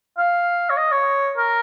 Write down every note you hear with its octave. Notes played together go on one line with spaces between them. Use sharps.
F5
C#5
D#5
C#5
A#4